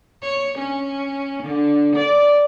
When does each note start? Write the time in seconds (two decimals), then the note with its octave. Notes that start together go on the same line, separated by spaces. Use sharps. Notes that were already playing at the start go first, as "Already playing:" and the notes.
0.22 C#5
0.58 C#4
1.43 D3
1.96 D5